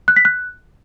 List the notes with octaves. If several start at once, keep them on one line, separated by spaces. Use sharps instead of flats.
F#6
B6
F#6